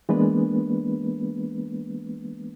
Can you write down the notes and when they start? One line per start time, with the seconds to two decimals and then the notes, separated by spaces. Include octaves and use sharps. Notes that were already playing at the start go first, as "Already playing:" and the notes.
0.09 E3 G#3 A#3 B3 D4 B4